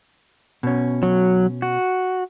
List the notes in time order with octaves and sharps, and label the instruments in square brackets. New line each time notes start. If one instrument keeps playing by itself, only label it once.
[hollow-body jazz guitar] B2 C#4
[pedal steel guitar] F#3
F#4